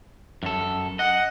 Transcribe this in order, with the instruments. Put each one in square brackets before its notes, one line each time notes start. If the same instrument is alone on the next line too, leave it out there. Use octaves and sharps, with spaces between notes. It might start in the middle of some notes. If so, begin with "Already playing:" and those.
[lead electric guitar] F#2 A4
[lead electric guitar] D#5 [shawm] F#5